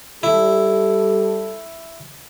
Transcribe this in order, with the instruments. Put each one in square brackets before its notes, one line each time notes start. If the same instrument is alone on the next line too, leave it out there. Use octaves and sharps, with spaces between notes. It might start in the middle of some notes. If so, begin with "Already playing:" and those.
[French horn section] G3 A4 [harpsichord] E4